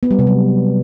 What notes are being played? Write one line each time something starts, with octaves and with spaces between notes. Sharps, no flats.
B3
G3
C3
F#3